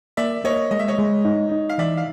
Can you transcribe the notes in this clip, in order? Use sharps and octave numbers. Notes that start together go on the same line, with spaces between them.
A#3 D5 E5
A#3 C#5 D#5
G#3 D#5
E5
C#5 D#5
G#3
D#4
D#4
F5
E3 D5 E5
F5